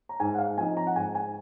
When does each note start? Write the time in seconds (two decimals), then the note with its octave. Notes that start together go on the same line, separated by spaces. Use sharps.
0.09 A#5
0.20 G#2 G#5
0.34 F#5
0.38 F5
0.58 F3 C4 D#4 G#5
0.77 A#5
0.87 F#5
0.96 G#2 G#5
1.15 G#5